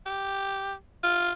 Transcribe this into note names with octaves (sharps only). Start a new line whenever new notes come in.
G4
F4